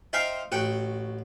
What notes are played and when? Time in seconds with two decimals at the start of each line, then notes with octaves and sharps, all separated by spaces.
0.13 D#4 C5 E5 F5 G5
0.52 A1 F#4 F#5 G5